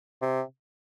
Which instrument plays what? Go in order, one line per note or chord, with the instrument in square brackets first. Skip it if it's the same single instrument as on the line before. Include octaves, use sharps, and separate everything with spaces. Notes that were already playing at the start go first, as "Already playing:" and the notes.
[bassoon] C3